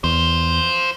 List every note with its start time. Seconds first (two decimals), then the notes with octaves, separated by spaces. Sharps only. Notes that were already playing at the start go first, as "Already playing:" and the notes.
0.04 E2 F4 C5